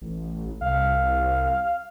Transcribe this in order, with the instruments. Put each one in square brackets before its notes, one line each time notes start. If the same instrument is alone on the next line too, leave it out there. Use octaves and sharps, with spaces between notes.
[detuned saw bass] A1
[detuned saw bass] C2 [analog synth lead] F5